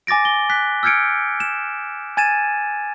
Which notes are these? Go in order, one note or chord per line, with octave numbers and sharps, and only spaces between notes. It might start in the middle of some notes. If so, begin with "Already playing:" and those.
G#5 D6 A6 A#6 D7
G7
F#6 B6
E6 F6 G6 G#6 C#7 D7
E7
G#5 G#6 A6 D#7 E7